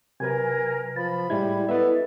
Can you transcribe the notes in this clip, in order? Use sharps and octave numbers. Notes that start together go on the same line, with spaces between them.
C3 F#3 A#4 B4 G#5
F3 A5 B5
A2 G3 G#3 E4 G#6
B3 A4 B4 D#5 E5